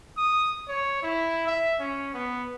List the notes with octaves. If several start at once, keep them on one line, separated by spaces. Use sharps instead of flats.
D#6
C#5
E4
E5
C#4
B3